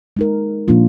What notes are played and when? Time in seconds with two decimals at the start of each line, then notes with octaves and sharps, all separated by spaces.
0.17 G#3 D#4 A#4
0.68 A#2 F3 A#3 D4 F4